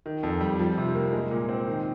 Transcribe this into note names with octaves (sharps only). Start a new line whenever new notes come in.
D#3
F2
G3
F3
C3
A#3
G#3
A#2
C4
D#3